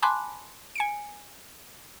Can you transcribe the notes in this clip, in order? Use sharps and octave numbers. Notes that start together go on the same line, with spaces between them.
G#5 A5 B5 C6 D6 F#6
G#5 C#7 D7